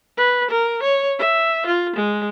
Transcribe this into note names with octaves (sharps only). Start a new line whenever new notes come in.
B4
A#4
C#5
E5
F4
G#3